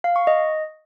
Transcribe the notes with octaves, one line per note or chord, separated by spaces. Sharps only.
F5
C#6
D#5